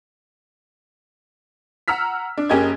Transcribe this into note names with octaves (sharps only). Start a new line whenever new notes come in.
F#5 A#5 E6 F6 B6
D4
F#1 C#4 G4 A#4 D#5 G#6